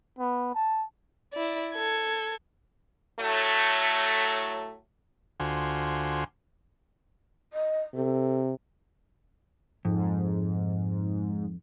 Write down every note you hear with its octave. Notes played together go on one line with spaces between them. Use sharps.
B3
A5
E4 D5
A4 G#6
A2 F#3 A3
D2 D3 F4 F#4 C5 G#5
D#5
C3 A4
F2 G#2